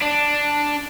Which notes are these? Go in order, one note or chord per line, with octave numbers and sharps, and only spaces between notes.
D4